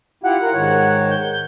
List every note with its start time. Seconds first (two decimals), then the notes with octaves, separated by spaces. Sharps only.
0.24 E4 F4 G4 F#5
0.42 F4 A#4
0.54 G#2 D#3 C#5
1.10 G6